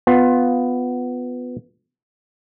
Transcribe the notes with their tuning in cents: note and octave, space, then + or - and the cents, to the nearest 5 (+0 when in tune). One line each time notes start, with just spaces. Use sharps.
B3 +10 F4 +15